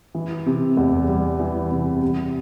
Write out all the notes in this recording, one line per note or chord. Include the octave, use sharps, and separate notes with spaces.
E3
C3
E2
G3
E3
C3
C3